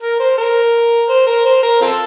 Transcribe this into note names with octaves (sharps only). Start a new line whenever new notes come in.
A#4
C5
A#4
C5
A#4
C5
A#4
C4 F4 A4